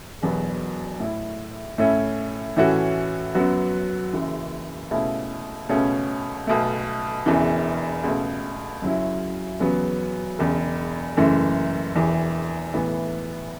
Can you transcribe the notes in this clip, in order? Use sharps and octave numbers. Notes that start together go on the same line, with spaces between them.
E1 E2 B2 F#3 B3
A2 A3 E4
A2 A3 C#4 E4
A2 E3 A3 C#4 F#4
F#2 F#3 B3 F#4
F#1 F#2 C#3 E3
C#2 B2 A3 C#4 E4
C#2 B2 A3 C#4
B1 B2 A3
E1 E2 C#3 E3
C#2 B2 A3
F#2 C#3 F#3 C#4 E4
E2 C#3 F#3 B3
E1 E2 C#3
F#1 F#2 E3 A3
E1 E2 E3
B1 A2 E3 B3